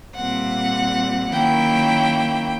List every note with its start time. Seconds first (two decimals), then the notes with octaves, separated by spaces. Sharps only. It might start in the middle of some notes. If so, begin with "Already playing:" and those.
0.16 A#2 G3 C4 F#5
1.31 D#3 F#3 A#3 C#4 E4 G5